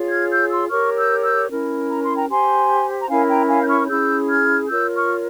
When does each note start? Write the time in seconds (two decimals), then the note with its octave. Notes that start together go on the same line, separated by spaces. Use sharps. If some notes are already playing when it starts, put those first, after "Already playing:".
Already playing: F4 G#4 C#5
0.11 F6 G#6
0.31 E6 G6
0.51 C6 E6
0.70 G4 A#4 C#5 C#6 F6
0.97 E6 G6
1.24 E6 G6
1.50 C#4 E4 A#4
1.90 A#5
2.03 C6
2.16 G5 A#5
2.29 G4 C5 G#5 C6
2.99 A#5
3.09 C#4 E4 A#4 C#5 F5 G#5
3.29 G5 A#5
3.49 F5 G#5
3.63 G6
3.69 C#6 F6
3.80 F6
3.88 C#4 E4 G#4 E6 G6
4.28 F6 G#6
4.68 F4 A#4 C#5 E6 G6
4.95 C#6 F6